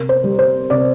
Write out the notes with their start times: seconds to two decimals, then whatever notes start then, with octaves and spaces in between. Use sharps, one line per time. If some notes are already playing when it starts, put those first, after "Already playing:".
Already playing: C3 A#4
0.09 C5
0.24 G3
0.39 C5
0.70 C3 D5